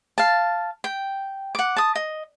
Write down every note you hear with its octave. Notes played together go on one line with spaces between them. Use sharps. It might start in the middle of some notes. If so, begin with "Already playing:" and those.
F5 A5
G5
F#5 D6
A5 D#6
D#5